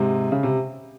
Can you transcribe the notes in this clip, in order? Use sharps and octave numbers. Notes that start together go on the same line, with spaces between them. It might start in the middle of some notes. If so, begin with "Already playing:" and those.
Already playing: G#2 C3
C#3
C3